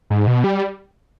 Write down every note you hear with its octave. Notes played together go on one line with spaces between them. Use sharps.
G#2
B2
G3